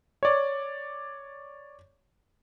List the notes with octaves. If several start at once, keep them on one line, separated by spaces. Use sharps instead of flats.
C#5 D5